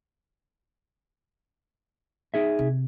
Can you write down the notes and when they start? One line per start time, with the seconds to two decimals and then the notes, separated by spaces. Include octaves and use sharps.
2.34 D#4 G#4 E5
2.59 C3